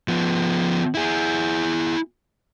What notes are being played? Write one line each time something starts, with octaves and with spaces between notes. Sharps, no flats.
F3 B3
E4 G#4